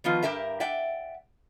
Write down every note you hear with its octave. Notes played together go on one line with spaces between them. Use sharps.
D#3 F3 B3 F4
G2 G4 A#4 E5 A#5
D5 E5 F#5 G5